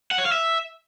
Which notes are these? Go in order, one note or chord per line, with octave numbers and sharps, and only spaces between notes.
F#5
C#5
F5
E5